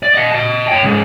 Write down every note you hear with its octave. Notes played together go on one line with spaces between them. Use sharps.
D5
D#5 F#5
D#5 A5
C#5 G5
C#2 G#2